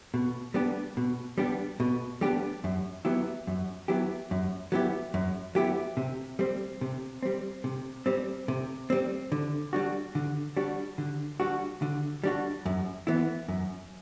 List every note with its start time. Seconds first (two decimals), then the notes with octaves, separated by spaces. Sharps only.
0.14 B2
0.54 G3 B3 D4 G4
0.97 B2
1.38 G3 B3 D4 G4
1.80 B2
2.21 G3 B3 D4 G4
2.64 F#2
3.05 F#3 B3 E4 G4
3.47 F#2
3.88 F#3 B3 E4 G4
4.31 F#2
4.72 F#3 B3 E4 G4
5.14 F#2
5.55 F#3 B3 E4 G4
5.97 C3
6.39 G3 C4
6.81 C3
7.23 G3 C4
7.64 C3
8.06 G3 C4
8.48 C3
8.90 G3 C4
9.32 D3
9.73 G3 D4 F#4
10.15 D3
10.57 G3 D4 F#4
10.98 D3
11.40 G3 D4 F#4
11.82 D3
12.24 G3 D4 F#4
12.66 F#2
13.07 E3 B3 E4
13.48 F#2